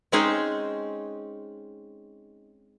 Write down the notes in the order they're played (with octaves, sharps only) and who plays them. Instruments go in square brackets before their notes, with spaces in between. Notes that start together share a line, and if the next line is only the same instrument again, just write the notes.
[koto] G#3 C4 C#4 D#4 G#4